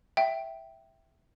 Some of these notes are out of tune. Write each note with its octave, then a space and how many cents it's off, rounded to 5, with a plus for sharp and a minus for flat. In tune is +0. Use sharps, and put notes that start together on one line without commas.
E5 +0 G5 -10